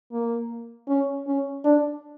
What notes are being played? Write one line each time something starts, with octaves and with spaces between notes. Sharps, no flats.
A#3
C#4
C#4
D4